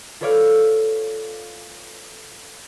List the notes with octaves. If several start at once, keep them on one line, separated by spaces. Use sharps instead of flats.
F4 A4 B4 C#5 D5 F5